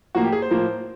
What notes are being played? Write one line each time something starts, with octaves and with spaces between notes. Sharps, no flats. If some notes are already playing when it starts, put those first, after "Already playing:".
A2 F3 A#3 F#4
G4
G#4
C5
A2 F3 A#3